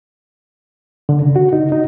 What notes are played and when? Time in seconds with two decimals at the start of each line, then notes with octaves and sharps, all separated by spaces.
1.09 D3
1.22 C#3
1.36 F#4
1.53 D#4
1.72 D#4